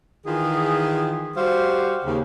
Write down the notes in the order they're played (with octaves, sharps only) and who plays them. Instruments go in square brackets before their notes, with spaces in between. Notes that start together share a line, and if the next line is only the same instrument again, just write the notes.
[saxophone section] D#3 E3 F4 G#4
G3 F#4 G4 C5 F5
D#2 C#3